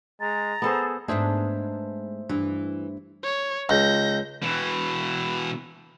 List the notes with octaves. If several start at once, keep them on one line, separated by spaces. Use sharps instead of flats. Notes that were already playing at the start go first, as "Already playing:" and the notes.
G#3 A#5 A6
B3 G#4 A4 C5
G#2 A3 B3 D4 G#4 C5 E5
G2 E3
C#5
C#2 G6 A#6
B2 E3